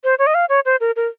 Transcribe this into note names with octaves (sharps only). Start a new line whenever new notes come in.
C5
C#5
D#5
F5
C#5
C5
A#4
A#4